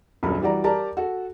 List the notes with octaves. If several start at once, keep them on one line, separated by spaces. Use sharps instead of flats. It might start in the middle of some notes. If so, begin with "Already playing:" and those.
D#1 A#1 F#2 B5
E3 G3 F#4 D5 A#5
G4 A#4 D5 A5 A#5
F#4 A4